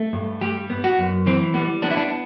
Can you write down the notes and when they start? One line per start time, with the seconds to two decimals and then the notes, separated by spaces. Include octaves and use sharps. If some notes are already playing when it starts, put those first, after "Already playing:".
Already playing: A3
0.13 G2
0.41 G3 G4
0.70 B3
0.84 F#4
0.98 F#2
1.26 E3 C4
1.54 G3 B3
1.82 B3 D4
1.91 E4
1.97 D4